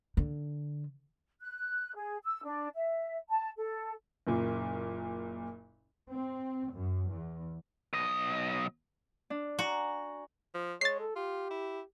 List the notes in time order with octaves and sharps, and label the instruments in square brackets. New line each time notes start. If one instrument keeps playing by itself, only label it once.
[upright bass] D3
[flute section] F#6
G#4
E6
D4
E5
A5
A4
[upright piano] F#1 A#2
[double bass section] C4
F#2
E2
[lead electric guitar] B1 D#5
[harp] D4
[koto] F#4 [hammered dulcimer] G#5 A#5
[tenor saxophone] F3
[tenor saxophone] G#3 [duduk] C#5 [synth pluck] A6 C7
[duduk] A4
[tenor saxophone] F4 [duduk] G4
[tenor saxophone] E4